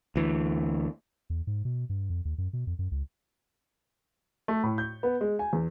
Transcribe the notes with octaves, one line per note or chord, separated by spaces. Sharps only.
D2 E3
E2
G#2
B2
G2
F2
D#2
F#2
B2
F2
F#2
C#2
A3
A2
G6
B3
G#3
G#5
E2